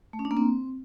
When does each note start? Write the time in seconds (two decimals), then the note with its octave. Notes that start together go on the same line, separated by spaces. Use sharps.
0.13 A3
0.19 C#4
0.25 D4
0.31 A#3
0.37 C4